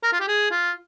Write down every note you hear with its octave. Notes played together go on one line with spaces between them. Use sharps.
A#4
F4
G4
G#4
F4